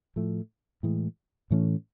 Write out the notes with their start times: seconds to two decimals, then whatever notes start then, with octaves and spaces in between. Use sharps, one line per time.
0.16 A2 F3 A3
0.83 A2 E3 G#3
1.51 A2 E3 A3 C#4